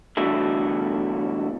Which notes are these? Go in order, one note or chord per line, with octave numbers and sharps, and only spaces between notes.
E2 B2 D3 G3 A3 E4